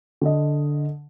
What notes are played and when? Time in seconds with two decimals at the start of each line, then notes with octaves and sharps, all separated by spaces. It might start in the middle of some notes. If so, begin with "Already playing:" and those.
0.21 D3 D#5